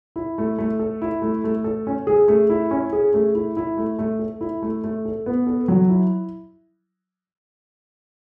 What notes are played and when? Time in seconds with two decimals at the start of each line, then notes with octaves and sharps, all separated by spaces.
0.16 E4
0.38 A3
0.58 A3
0.79 A4
1.02 E4
1.22 A3
1.44 A3
1.64 A4
1.87 C#4
2.07 G#4
2.28 A3
2.50 E4
2.71 C#4
2.93 G#4
3.14 A3
3.35 E4
3.57 E4
3.77 A3
3.99 A3
4.19 A4
4.41 E4
4.62 A3
4.84 A3
5.05 A4
5.26 B3
5.47 A4
5.68 F#3
5.89 E4